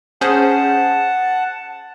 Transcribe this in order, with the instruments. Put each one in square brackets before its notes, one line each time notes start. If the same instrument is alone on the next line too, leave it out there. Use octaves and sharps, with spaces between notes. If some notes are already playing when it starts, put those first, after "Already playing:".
[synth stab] C#4 G#4 C5 [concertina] F#5 A5